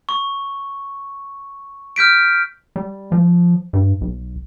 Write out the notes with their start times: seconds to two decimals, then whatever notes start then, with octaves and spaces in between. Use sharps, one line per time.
0.09 C#6
1.96 F6 G6 B6 D7
2.76 G3
3.12 F3
3.73 G2
4.01 B1